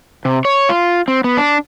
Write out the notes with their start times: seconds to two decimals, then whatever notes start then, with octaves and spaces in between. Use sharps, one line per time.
0.25 C3
0.45 C#5
0.69 F4
1.08 C4
1.24 B3
1.37 D4